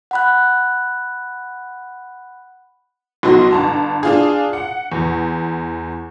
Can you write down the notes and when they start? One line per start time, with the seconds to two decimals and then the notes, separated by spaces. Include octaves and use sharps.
0.11 F#5 B5 F#6
3.23 B1 B2 F#3 F#4 C6
3.51 G1 A5 A#5
4.03 D4 F4 G#4
4.53 F#5
4.92 E2